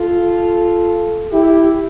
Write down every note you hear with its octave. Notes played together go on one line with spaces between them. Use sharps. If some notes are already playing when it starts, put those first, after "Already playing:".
Already playing: F4 A4
E4 G4